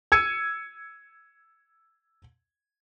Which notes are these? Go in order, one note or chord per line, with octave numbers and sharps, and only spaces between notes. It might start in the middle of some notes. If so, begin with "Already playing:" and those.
E6 G#6 C#7 D#7